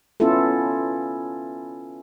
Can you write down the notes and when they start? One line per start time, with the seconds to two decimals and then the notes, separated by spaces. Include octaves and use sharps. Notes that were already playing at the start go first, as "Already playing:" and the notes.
0.20 B3 C#4 E4 F4 A4